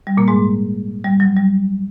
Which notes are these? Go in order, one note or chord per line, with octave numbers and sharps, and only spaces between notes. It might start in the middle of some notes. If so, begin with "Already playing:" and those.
G3
A#2 A#3
G#2 G#3
G3
F#3
G3